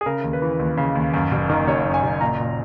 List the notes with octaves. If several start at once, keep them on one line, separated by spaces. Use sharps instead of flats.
G#4
C#3 A#4
D#2
B4
E3
D#2
C#3
D#2
F#2
F#1
D#3
F#1 C#5
F#2
G#5
F#1
A#2 A#5
A#2